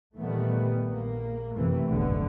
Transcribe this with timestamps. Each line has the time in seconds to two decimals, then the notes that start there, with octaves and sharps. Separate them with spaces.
0.18 A#2 D#3 E3 G3 A3 B3
0.89 A#1 A#3
1.54 F#2 C3 E3 A3
1.87 F1 B1 G#2 B2 D3 B3